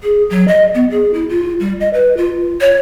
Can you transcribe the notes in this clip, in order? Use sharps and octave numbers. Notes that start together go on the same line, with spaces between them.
G#4
F#3
D#5
B3
G#4
E4
F4
G3
D#5
B4
F4
C#5